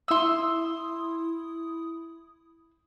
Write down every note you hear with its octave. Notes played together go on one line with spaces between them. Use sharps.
E4 C6 D#6 E6